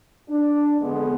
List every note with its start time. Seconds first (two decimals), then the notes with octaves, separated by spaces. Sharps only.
0.29 D4
0.81 F2 D3 G#3 B3